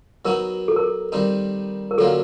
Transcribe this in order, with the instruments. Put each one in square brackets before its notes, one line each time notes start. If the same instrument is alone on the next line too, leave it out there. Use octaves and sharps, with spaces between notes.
[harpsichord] F#3 B3 D#4 F#4 [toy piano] A#4
[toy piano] A4
A#4
A4
[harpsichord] D#3 G3 C4 D#4
[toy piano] A#4
[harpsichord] D3 F#3 A#3 C#4 F4 [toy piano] A4